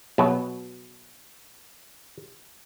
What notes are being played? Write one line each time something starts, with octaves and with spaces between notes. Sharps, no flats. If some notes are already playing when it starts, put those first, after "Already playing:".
B2 F#3